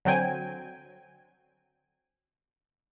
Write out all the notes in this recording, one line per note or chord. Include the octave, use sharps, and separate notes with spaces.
D3 F#3 C4 G5 G#5